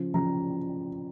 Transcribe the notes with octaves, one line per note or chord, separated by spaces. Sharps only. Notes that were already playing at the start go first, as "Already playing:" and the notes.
Already playing: C#3 F3
C#3 F3 A#5